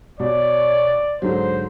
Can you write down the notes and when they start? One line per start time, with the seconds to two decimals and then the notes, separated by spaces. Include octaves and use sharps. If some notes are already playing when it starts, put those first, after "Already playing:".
0.20 B2 C#5 D5
1.22 G#2 D3 F#3 C5